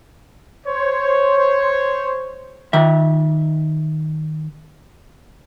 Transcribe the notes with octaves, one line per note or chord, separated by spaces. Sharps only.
C5 C#5
D#3 E5